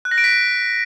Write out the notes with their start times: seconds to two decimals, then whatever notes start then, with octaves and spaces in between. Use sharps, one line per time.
0.05 F#6
0.11 A#6
0.18 D7
0.24 B6